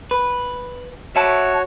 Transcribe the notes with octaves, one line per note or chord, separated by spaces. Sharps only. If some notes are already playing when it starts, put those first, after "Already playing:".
B4
F#4 C#5 E5 F#5 A5